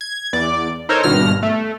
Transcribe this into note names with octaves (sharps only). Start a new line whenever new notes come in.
G#6
E2 D5 D6
D#4 A4 A#4 C5 C#5
G#1 G2 B2 F6 A#6
A3